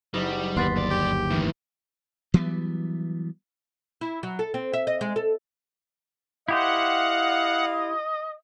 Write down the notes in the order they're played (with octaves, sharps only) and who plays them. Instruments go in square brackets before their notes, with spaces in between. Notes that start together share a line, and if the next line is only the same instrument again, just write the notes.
[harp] F#1 D#4 E7 [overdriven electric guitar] G3
[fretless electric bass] G1 D#2 [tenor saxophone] B3 [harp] C6 A6 B6
[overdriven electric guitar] F#2 D5
[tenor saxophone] G4
[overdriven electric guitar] A2 D#3 [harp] E3
[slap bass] E3 F#3 G3 B3
[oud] E4
F#3
A4
C4
E5
D#5
G#3
A4
[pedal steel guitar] E4 G4 C5 [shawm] D#5 [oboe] F5 [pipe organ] F#5